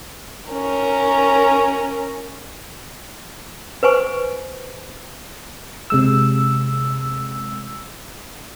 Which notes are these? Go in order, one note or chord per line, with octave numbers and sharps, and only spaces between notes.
C#4 A#4
B4 C5 G#5 C#6
C3 G#3 E6